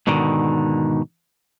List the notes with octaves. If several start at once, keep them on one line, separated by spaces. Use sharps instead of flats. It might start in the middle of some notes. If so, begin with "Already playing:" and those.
G#2 B2 D3 D#3